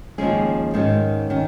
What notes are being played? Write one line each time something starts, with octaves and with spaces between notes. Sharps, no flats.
D#2 C#3 F3 G#3 C#4 G#4
G#2 D#3 C#4
D#3 C#4